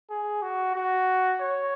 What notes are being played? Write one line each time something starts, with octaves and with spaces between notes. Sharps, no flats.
G#4
F#4
F#4
C#5